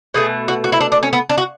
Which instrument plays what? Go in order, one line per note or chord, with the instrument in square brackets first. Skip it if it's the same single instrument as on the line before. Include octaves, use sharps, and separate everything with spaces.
[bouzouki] B2 A3 G#4
F#4
F#4
E4
D4
D4
C#4
B3
D4
F#4